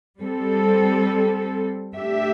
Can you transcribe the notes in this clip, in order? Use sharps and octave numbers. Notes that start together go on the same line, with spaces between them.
G3 C4 A4
A3 D4 G4 E5